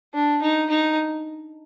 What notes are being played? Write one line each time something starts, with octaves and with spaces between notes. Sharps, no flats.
D4
D#4
D#4